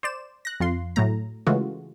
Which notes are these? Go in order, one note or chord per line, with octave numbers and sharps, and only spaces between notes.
C5 D5 E7
F#6 A#6
F2 F4 C6
A2 F#3 A3 A#5
C#3 E3 G#3 A3 F4 F#4